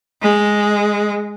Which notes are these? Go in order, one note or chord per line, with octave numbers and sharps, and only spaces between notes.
G#3